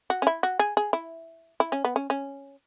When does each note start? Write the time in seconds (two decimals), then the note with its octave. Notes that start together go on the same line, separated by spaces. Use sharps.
0.10 F#4
0.22 C#4
0.27 E4
0.43 F#4
0.59 G#4
0.77 G#4
0.93 E4
1.60 E4
1.72 C#4
1.85 B3
1.96 C#4
2.10 C#4